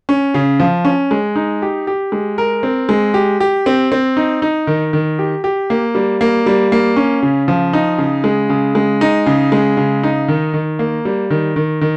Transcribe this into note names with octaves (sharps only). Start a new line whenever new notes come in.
C#4
C#3
F3
C#4
G#3
D#4
G4
G4
G#3
A#4
C4
G#3
G4
G4
C4
C4
D#4
D#4
D#3
D#3
G4
G4
A#3
G3
A#3
G3
A#3
C#4
C#3
F3
D#4
C#3
G#3
C#3
G#3
D#4
C#3
G#3
C#3
D#4
D#3
D#3
A#3
G3
D#3
D#3
D#3